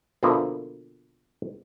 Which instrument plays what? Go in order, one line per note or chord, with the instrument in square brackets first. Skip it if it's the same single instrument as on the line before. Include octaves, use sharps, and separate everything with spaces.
[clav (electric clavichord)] B2 D3 F3 A#3 E4 E5